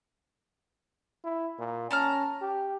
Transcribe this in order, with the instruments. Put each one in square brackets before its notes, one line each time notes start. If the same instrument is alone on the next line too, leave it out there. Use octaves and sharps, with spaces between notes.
[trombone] E4
A#2
[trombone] C#4 [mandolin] A5 A#5 F6
[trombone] G4